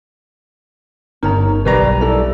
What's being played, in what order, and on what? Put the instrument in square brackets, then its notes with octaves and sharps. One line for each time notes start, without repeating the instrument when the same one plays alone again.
[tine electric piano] G1 A#4 [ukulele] D#4 C#5 A#5
[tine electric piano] B1 G3 A#5 [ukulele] B4 D5
[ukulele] E4 A4 D5